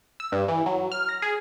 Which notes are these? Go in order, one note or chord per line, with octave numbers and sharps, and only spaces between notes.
E6
G2
E3
F#3
F6
A#6
G#4